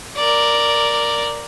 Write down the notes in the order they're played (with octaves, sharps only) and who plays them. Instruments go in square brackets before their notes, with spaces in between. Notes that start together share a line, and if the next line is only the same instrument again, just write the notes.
[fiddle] A#4 D5